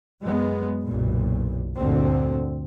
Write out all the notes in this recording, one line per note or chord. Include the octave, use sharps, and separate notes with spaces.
F#2 G#3 B3
F#1 B1 A#2
D2 G2 A#2 D3 C4